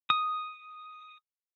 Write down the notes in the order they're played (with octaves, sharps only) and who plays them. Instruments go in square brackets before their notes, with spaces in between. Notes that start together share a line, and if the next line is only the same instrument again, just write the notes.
[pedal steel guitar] D#6